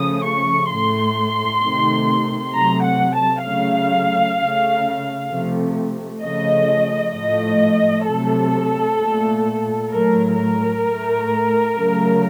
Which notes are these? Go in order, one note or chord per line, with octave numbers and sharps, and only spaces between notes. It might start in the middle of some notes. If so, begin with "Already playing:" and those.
Already playing: C#3 F3 A3 D#6
C#6
A2 A3 C6
C3 D#3 A3
C3 F#3 A3 A#5
F#5
A5
C#3 F#3 A3 F5
C#3 A3
C3 F3 A3
C#3 F3 A3 D#5
A2 F3 A3 D#5
C3 F#3 A3 A4
A#2 A3
A2 F#3 A3 A#4
A#4
A2 A3
C#3 F#3 A3